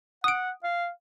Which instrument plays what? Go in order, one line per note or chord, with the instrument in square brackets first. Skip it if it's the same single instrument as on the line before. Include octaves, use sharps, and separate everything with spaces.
[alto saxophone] F#5 [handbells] D#6 D7
[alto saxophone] F5